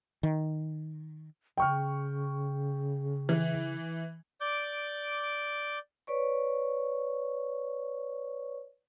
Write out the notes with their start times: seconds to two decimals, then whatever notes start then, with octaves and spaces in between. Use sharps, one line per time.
0.23 D#3
1.57 C#3 G5 C#6 F6
3.29 E3
4.41 D5 D6 G6
6.07 B4 C#5 D5 C#6